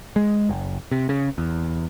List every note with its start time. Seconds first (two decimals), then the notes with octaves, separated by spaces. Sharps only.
0.16 G#3
0.49 F#1
0.92 C3
1.09 C#3
1.38 E2